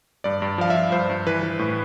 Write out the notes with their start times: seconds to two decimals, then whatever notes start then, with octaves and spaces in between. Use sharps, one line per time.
0.24 G2 D5
0.42 G2
0.58 F3 F5
0.70 E5
0.76 F3
0.92 G2 C5
1.10 G2
1.27 E3 B4
1.43 E3
1.59 A2